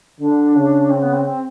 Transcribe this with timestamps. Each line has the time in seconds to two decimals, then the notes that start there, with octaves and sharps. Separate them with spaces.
0.20 D3 D4
0.56 C#3
0.90 C4
1.02 B3
1.13 C4
1.25 C4